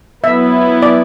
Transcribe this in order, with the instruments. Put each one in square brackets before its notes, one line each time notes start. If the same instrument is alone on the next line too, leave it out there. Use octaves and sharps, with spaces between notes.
[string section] F#3 B3 E4 [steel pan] E5
[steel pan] D5